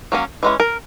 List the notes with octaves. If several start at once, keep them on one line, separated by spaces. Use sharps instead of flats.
F#3 A#3 C#4
E3 G#3 C#4
A#4